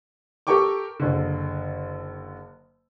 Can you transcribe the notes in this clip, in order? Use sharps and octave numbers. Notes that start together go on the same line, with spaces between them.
G4 A4 A#4 G5 C#6 D6
F#1 D3